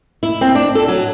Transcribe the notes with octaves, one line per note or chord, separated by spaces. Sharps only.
E4
C4
D4
A4
F#3